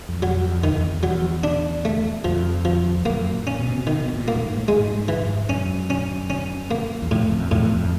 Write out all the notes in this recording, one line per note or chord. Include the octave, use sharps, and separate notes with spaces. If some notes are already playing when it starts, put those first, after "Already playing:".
F2
F#3
F2
F2 D#3
E2
E2
F#3
D4
A3
F2 F3
F3
F2
F#2 A#3
A#2
C#4
B2
C3
B2 D#3
B2
A#2
A#3
G2
G#2
A2
G#2 G#3
G#2
G2 E3
G#2
F#2 C#4
C#4
C#4
A#3
E2
F2 A2
E2
F2
E2 A2
F2